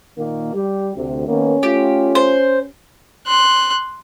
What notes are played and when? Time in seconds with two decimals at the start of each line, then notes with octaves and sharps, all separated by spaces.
0.18 A#2 D#3 A#3
0.53 G3 G4
0.96 D2 C3
1.27 D#3 A#3 B3 C#4
1.63 A3 F4 G4
2.15 C5
3.27 C6 F#6